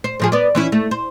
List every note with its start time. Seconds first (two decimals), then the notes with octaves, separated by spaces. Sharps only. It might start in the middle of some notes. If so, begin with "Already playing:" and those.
0.04 C5
0.20 A2 F3 G#4
0.32 B3 D5
0.55 E3 C#4 E4
0.72 A3
0.91 C5